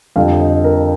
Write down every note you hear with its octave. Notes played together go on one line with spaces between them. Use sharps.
F2 D3 G3 F5
D#5
A#4